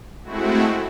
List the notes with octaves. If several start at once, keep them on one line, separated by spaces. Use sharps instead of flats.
G#3 A3 C4 E4 F#4